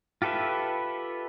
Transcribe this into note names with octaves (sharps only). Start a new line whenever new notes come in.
F4 G4 A4 B4 E5